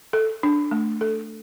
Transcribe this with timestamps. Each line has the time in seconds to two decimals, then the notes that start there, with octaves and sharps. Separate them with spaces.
0.13 A4
0.43 D4
0.71 A3
1.01 A4